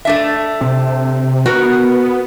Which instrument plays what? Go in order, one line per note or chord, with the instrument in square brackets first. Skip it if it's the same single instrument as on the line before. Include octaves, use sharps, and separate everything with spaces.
[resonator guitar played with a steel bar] A3 D4 E5
[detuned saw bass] C3
[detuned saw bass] B3 [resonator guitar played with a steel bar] F#4 A#4